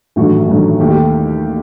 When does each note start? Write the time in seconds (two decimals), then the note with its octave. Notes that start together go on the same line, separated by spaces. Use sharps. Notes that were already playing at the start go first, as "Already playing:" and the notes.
0.16 A1 G2 D#3 F#3 A3 F#4
0.48 A1 G2 D#3 F#3 A3
0.79 D#2 D#3 A3 G4
0.90 G4